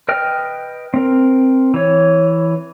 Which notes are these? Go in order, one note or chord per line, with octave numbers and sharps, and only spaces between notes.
B4 D#5 G5 F6
C4 A#4
E3 C#5